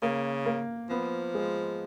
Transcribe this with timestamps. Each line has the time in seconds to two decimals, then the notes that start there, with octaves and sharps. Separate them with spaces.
0.02 C#3 A#3
0.46 A#3
0.90 F3 B3
1.35 G#3